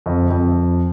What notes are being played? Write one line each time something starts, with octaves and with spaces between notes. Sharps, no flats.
F2
F2